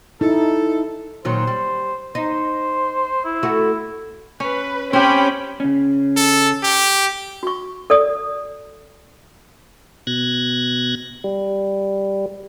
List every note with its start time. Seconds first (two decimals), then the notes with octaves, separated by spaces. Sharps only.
0.21 D#4 E4 A4
1.25 A#2 D#3 F#3 C5
1.47 G3
2.15 D#4 C5
3.25 E4
3.43 A3 F#4
4.40 C#4 B4
4.93 C4 C#4 G4 G5 B5
5.60 C#3 C#4
6.16 A4
6.63 G4
7.43 F#4 C#6
7.90 A4 D5 D#6
10.07 B2 F#6 G#6 A#6
11.24 G3